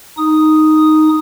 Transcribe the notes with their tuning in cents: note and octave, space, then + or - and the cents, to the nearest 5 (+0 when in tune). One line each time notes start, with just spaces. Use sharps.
D#4 +0 D#6 +0